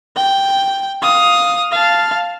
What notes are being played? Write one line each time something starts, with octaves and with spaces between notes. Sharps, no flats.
G5
F5 D#6
F5 A5